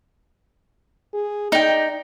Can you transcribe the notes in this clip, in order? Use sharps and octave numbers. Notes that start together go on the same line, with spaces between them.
G#4
D#4 D5 G5